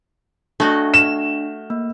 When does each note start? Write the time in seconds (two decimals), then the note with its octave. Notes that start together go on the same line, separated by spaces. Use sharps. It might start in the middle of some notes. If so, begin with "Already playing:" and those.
0.60 A3 D4 F#4 D#5
0.94 E7
1.70 A#3